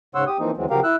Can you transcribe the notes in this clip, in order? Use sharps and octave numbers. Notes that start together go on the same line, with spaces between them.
G#2 C#3 C#5 F#5 C6 E6
G4 D#6
E3 F3 A#3 C4 D#4
D2 E3 F#3 G#3 C4
C#3 F3 F#3 G4 A#4 F5
E4 E6 F#6